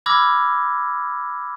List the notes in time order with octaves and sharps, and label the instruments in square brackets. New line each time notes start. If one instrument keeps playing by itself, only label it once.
[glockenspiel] B5 D6 E6 F6 G#6 A#6